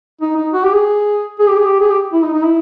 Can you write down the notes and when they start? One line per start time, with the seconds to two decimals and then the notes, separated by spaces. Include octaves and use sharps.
0.21 D#4
0.36 D#4
0.53 F#4
0.63 G4
0.73 G#4
1.39 G#4
1.48 G4
1.56 G#4
1.65 G4
1.81 G#4
1.90 G4
2.13 E4
2.23 D#4
2.34 D#4
2.44 E4